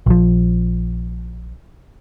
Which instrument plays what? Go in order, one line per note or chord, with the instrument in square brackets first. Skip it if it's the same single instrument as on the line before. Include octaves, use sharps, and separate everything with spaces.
[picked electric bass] A#1 F3